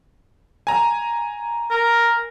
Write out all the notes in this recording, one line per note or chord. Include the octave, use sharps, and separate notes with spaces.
G#5 A#5
A#4